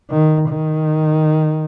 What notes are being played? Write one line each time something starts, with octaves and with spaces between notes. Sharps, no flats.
D#3
D#3